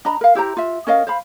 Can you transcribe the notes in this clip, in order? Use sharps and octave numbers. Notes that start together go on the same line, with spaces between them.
D4 D#5 A#5 B5
A#4 F5
E4 G4 C5 A#5
F4 E5
C#4 A#4 D#5 F5
C5 F5 B5